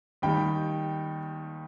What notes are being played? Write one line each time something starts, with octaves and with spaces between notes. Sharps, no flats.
D#2 D#3 G3 G5 B5